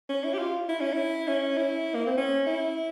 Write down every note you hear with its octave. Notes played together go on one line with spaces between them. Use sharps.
C#4
E4
G4
F4
E4
C#4
E4
C#4
E4
A#3
C4
C#4
E4